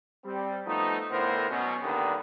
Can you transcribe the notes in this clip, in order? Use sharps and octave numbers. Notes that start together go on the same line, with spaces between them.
G3 C4
F3 A3 B3 D#4
A2 D3 B3 A#4 C5
B2 F#3 C#4
G2 D3 D#3 G3 A#3 B3